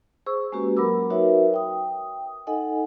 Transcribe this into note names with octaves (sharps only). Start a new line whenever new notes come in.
G#4 C5 C#6 E6
G#3 A#3 C#4 F#4 G4 B4
F#3 A#3 A#4 B5 D6 E6
D#4 F#4 A#4 B4 C#5 E5
G5 D#6
D#4 A4 D#5 F#5 G#5